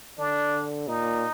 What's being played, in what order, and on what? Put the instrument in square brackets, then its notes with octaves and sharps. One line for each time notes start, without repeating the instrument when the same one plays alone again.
[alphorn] D3 [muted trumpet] D4
[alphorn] A#2 [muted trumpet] D#4